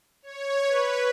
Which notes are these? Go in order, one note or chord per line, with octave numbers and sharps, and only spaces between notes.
C#5
B4